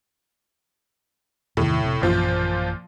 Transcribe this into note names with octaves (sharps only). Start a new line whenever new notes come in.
E2 A2 C3 D#3
F1 C3
A1 F#2 A#2 E3 F3 F4